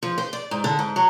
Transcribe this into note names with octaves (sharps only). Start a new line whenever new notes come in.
F3
C5
D5
G#2
D3
G#2
F#3